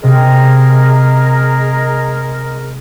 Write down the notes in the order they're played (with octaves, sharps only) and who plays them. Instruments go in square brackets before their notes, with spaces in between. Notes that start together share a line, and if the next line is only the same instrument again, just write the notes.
[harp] C3 [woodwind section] G#3 G#4 A#4